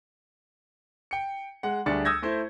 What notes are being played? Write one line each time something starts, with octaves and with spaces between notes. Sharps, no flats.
G5 C#7
G#3 F#5
D2 G3 D4 G#4 A6 C#7
D#6 E6 G6 G#6 A#6
A3 E4 C5